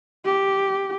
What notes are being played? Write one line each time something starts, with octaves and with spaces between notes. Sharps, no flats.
G4